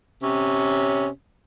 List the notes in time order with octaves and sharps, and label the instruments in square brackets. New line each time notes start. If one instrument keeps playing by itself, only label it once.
[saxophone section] C3 C#4